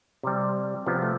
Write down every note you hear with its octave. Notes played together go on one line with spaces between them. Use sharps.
C3 G3
C3 F3 B3
A3